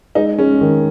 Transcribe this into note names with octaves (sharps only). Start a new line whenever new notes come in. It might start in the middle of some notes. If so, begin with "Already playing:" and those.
G#3 D#4
G#3 C#4
D#3